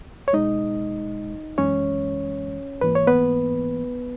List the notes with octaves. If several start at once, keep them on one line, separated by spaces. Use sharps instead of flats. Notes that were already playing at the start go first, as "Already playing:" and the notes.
C#5
B2 G#3 D#4 D#5
F#2 E3 G#3 C#4 C#5
G#2 E3 A#3 B4
C#5
B3 B4